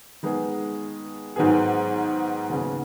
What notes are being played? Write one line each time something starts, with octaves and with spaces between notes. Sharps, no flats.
D#3 G#3 B3 G#4
G#2 D#3 F#3 B3 G#4
D#2 C#3 B3 G#4